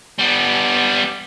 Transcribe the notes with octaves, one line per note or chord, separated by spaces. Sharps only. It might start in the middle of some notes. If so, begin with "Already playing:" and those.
G3 B3